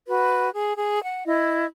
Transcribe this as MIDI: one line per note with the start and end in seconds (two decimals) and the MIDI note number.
0.07 0.49 66
0.07 0.49 71
0.53 0.72 68
0.77 1.01 68
1.04 1.24 78
1.27 1.66 64
1.27 1.66 75